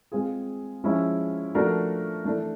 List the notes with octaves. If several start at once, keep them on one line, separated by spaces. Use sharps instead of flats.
G#3 C4 F4 G#4
F3 G#3 C#4 E4
F3 A3 D4 F#4 A#4
E3 A3 D4